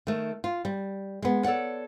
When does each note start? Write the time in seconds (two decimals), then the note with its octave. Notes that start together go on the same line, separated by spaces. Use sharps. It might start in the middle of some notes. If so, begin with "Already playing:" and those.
0.07 D#3 A3
0.44 F4
0.65 G3
1.22 G#3 B3
1.44 A4 C#5 D5 F#5